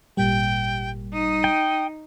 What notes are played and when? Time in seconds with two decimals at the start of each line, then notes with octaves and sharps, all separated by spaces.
0.17 G#1 A#2 G3 G5
1.13 D#4 D#6
1.44 G5